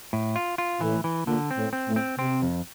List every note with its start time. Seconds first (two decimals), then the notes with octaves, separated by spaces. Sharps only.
0.13 A2
0.36 F4
0.58 F4
0.81 A2 E3
1.04 E3
1.27 A#2 D3
1.51 C4
1.57 A2
1.73 C4
1.88 A2
1.96 C4
2.19 C3 C4
2.42 F2